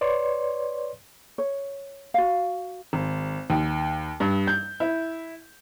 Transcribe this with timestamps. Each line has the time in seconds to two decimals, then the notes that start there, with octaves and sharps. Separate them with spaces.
0.01 B4 C#5 D5 C6
1.38 C#5
2.14 F#4 F5
2.93 G#1
3.50 D#2
4.20 G2
4.48 G6
4.80 E4